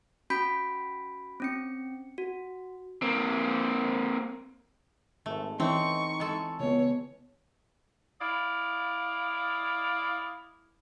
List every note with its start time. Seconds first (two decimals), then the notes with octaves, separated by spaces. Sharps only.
0.30 C#4 F#4 B5 G6 B6 D7
1.40 C4 C#4 C#7
2.18 F#4
3.02 A#3 C4
5.26 G#1 A3
5.60 E3 A3 C4 C#4 D#4 E4 C#6
6.20 G#3 A4
6.60 C#2 C#3 B3 C#5
8.21 E4 D5 D#5 F5